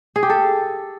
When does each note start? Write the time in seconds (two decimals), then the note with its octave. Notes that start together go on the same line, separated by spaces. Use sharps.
0.16 G#4
0.23 G4
0.30 A4